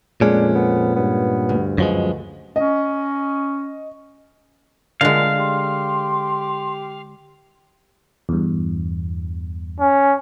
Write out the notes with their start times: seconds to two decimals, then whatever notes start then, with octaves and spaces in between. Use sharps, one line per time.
0.21 F2 A#2 G#3 C#4 D4
0.55 B3
0.96 G2 B3
1.49 D2
1.78 F#2 B2 F3 G#3
2.56 C#4 D#5
5.01 A#2 D3 G#3 F5
5.38 G4 C6
8.29 E2 G2
9.80 C#4